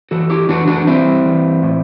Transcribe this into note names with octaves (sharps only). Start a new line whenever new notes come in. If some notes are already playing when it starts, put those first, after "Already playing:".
E3 F#4 A4
E4 G4
E3 D4 F#4
D4 F#4
G3 C4 E4
E3
A2